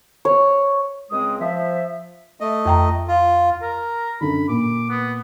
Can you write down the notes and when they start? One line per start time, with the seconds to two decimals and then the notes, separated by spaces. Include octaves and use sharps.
0.25 C#5
1.11 C#2 G#3 C4 D#6
1.41 F3 E5
2.40 A3 D#5
2.65 F2 G5 A#5
3.08 F4
3.62 A#4
4.21 F#2 D3 B5
4.48 A#2 D6
4.89 B3